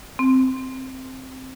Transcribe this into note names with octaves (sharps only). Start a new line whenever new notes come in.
C4